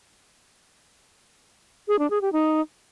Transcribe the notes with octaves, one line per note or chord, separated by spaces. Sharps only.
G#4
D4
G#4
G4
D#4